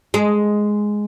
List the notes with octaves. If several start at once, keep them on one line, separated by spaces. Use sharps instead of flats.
G#3